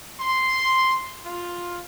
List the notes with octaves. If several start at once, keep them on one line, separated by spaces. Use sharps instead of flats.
C6
F4